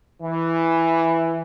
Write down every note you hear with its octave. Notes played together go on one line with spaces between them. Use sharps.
E3